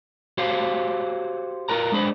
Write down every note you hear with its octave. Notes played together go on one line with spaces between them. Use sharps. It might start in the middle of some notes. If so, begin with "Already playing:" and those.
F#4 G4 C5 C#5 F5
F4 A#4 B4 A#5
G#3 D4 B4 C5